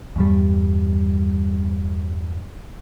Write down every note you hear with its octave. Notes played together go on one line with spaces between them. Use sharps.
E2 G2 G3